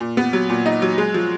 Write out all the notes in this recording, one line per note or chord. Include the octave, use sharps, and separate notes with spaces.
A#2
B3
F#3
A#2
D#4
F#3
G#3
F3